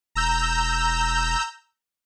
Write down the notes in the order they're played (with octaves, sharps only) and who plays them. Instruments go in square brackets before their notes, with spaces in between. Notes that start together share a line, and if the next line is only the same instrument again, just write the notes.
[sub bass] E1 [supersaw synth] A#5 E6 G6